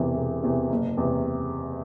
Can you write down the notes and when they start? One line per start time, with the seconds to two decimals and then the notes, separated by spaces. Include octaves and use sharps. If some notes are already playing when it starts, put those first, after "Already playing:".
Already playing: E1 E2 C3 E3
0.16 E1
0.43 E2 C3 E3
0.70 F#1
0.97 E2 C3